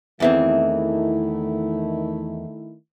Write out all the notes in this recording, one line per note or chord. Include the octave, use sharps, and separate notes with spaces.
E2 D#3 E3 A3 C4 E4